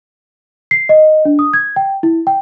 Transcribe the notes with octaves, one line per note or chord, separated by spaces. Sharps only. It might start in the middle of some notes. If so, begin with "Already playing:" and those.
C7
D#5
D4
D#6
G#6
G5
E4
G5